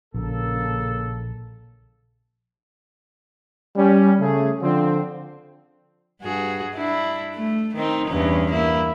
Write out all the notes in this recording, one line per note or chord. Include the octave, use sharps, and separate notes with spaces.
A#1 C#3 A#3 A4
G3 C#4
C#3 A3 G#4
D3 F3 C4
G2 F#4 G#4
D4 E4
A3
D#3 C4 D#4
E2 G2 C#4
A#3 E4